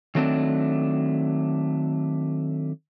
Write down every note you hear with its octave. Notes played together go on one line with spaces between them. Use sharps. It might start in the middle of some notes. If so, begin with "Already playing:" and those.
D#3 F#3 A3 C4 D4